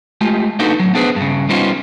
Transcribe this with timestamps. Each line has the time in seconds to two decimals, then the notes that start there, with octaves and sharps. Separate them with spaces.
0.21 G#3 A3 F4 G4
0.59 A#3 D4 D#4 F#4 A4 B4
0.80 A2 F#3
0.95 B3 D4 G#4 B4 C5
1.16 G2 C#3
1.49 G3 B3 C#4 D#4 F4 C5